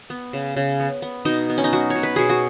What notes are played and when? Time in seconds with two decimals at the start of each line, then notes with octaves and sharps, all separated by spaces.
0.10 B3
0.33 C#3
0.56 C#3
0.80 B3
1.02 B3
1.25 B2 D#4
1.50 B3
1.58 C#4
1.64 D#4
1.73 F#3 F#4
1.90 C#5
1.96 B2
2.03 B4
2.16 B2 G#4
2.30 F#4